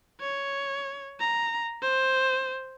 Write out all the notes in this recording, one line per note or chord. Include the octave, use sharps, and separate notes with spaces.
C#5
A#5
C5